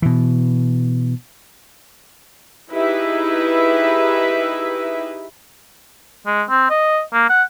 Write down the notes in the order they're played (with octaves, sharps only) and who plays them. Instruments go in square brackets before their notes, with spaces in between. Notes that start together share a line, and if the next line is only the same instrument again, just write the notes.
[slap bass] B2 E3
[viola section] D#4 E4 G4 G#4 B4 E5
[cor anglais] G#3
C4
D#5
A#3
F#5